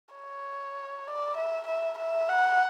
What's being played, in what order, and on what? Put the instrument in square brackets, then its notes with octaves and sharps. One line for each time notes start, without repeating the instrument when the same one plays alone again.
[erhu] C#5
D5
E5
E5
E5
F#5